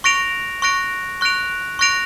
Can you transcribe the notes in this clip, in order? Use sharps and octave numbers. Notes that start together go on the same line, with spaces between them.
C#6 F#6 A#6 D7 F7
C#6 F#6 A#6 D7 F7
C#6 F#6 A#6 D7 F7
C#6 F#6 A#6 D7 F7